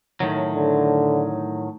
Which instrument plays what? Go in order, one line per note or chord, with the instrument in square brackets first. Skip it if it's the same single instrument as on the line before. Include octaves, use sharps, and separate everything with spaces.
[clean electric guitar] A2 D#3 F#3
[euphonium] D3